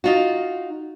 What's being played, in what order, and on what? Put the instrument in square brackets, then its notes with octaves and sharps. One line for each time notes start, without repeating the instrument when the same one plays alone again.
[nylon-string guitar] D#4 F4 F#4